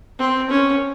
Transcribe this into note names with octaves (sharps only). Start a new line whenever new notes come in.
C4
C#4